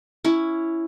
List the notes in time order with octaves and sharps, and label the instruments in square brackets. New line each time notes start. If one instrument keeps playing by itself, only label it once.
[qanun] C#4 E4